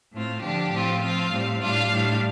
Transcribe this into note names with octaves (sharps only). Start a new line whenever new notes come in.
A2 A3 C4 F4
D3 F3 D4 G4
A2 F3 C4 F4
F3 C4 F4 F5
A2 G3 C4
A2 G3 D4 F4 F5
A2 G3 D4